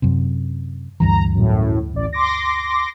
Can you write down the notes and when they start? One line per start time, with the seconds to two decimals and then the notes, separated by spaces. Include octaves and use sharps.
0.02 F#2 C3
1.00 D2 G2 E3 A#5
1.34 F#2 A2
1.94 A1 D5
2.13 C6 D6 A#6